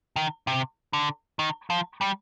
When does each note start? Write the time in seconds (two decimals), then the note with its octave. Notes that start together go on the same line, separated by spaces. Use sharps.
0.16 D#3
0.47 C3
0.93 D3
1.39 D#3
1.70 F3
2.01 G3